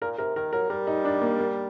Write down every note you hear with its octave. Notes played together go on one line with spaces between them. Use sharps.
A#2 A#4
C3 A#4
D#3 A#4
F#3 A#4
G3 A#4
D#4
D4
A#3
A#3